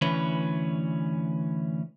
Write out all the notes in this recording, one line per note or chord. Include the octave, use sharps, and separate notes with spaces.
D2 E3 C#4 B4